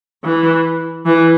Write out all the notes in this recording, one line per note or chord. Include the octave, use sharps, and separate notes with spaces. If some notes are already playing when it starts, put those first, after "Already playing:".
E3
E3